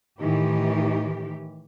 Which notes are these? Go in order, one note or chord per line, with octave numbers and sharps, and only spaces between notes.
A2 D#3 E3 G4